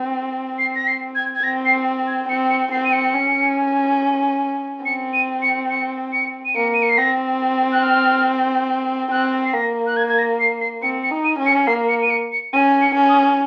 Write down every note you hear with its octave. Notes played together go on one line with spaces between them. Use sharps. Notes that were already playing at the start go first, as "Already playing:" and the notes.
Already playing: C4
C7
A#6
C7
G#6
G#6
C4 A#6
C7
G#6
C4 C#7
C#7
C4 C7
D#7
C#7
C#4
C4 C#7
D#7
C#7
C#7
C#7
D#7
A#3 C#7
D#7
C#7
C7
C4 A#6
F#6
F6
C4 F#6
C7
A#3 A#6
F#6
G#6
G#6
A#6
C7
C7
C4 C#7
C#7
D#4
D#7
C#4
C#7
A#3 C7
C#7
D#7
C#7
C#7
C#4 D#7
C#7
C#4
D#6